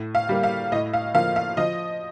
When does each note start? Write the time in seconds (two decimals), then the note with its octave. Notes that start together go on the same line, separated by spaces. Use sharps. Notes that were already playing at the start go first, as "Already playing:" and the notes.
Already playing: A2
0.15 F5
0.29 G3 A#3
0.43 F5
0.72 A2 D#5
0.93 F5
1.15 F3 A#3 F5
1.36 F5
1.57 F3 D#5